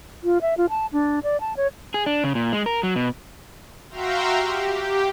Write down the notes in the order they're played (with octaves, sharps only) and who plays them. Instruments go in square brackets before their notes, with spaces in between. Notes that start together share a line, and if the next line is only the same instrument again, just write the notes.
[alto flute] F4
E5
F4
A5
D4
D5
A5
C#5
[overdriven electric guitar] G#4
D4
C#3
A#2
G#3
A#4
F#3
B2
[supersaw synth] F#4 E5 F5 G5 A#5 C6
G4